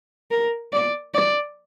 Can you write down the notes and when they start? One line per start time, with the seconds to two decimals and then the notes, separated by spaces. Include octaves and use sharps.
0.31 A#4
0.73 D5
1.14 D5